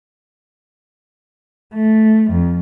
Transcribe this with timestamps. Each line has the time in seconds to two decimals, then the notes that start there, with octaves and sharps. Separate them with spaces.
1.75 A3
2.31 F2